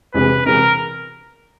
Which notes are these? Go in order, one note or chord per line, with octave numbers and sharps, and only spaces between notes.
E1 E2 C3 B4
E1 E2 C3 A#4